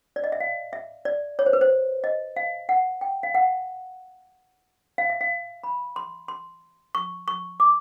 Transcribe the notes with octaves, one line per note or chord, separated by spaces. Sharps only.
D5
D#5
E5
F5
E5
D5
C#5
C5
B4
C5
D#5
F5
F#5
G5
F5
F#5
F5
E5
F5
B5
C6
C6
C#6
C#6
D6